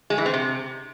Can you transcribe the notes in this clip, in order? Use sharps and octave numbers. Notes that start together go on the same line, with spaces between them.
G#3
E3
C4
C3